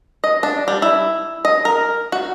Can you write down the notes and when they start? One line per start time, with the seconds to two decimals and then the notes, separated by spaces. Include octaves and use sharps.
0.24 D#5
0.43 D4
0.68 G3
0.82 E4
1.45 D#5
1.65 A#4
2.12 F#4